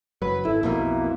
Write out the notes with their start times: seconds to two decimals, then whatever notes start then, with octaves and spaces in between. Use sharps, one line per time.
0.22 F#1 F#3 B4
0.45 G#1 E4 A4
0.63 B1 F2 B2 A#3